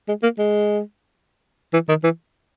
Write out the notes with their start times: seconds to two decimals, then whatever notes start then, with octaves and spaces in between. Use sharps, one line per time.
0.08 G#3
0.22 A#3
0.38 G#3
1.73 E3
1.89 D#3
2.04 E3